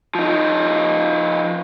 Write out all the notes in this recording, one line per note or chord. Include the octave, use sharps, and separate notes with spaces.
F3 D#4